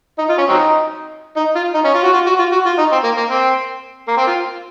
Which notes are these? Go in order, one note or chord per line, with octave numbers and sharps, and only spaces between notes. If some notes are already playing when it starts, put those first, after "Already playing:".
D#4
F4
C#4
F#3 C4 D#4
D#4
F4
D#4
C#4
F4
F#4
F4
F#4
F4
F#4
F4
D#4
C4
A#3
A#3
C4
A#3
C4
F4